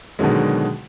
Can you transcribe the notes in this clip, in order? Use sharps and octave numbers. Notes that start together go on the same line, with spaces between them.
B2 D3 D#3 F#3 G#3